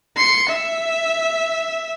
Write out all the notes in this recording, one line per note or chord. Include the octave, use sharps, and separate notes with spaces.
C6 C#7
E5